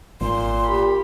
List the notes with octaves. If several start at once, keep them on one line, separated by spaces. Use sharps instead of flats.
G#1 A#2 C6
G4 B5